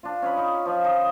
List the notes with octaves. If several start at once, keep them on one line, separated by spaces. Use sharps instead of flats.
D4 F4
C#4 C#5 D#5 B5
C#4 D#4
F3 D#5
D#4 D#5